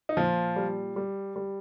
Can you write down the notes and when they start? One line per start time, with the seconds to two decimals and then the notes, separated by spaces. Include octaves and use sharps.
0.09 D#4
0.17 A#2 F3 F4
0.56 G3
0.96 G3
1.36 G3